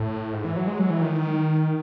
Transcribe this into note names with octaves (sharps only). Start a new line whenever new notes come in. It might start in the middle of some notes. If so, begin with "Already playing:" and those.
Already playing: A2
G#2
E3
F#3
G#3
F#3
E3
D#3